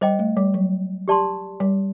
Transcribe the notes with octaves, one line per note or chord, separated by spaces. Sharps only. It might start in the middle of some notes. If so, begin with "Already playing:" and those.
G3 C5 D#5 G5
A3
G3
F#3
G4 D5 A5 C6
G3